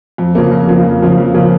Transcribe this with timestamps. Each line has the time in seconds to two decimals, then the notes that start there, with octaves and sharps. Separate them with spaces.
0.18 F2
0.35 C#3 F3 A#3
0.51 F2
0.68 C#3 F3 A#3
0.84 F2
1.02 C#3 F3 A#3
1.18 F2
1.34 C#3 F3 A#3